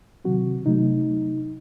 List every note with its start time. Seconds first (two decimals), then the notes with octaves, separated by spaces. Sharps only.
0.25 C3 D#3 F#3 C4 F#4
0.66 C3 F#3 A3 D#4